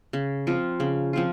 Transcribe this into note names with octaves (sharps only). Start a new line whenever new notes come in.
C#3
F3 C4 F4
C#3
F3 C4 F4